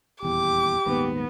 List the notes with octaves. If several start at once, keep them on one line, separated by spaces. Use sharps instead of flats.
D#1 E2 G4 D6
D#1 D#2 G#2 B3